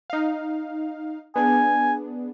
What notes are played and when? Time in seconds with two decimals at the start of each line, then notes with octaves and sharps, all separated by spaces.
0.10 D#4 F5
1.36 B3 D4 G#4 G#5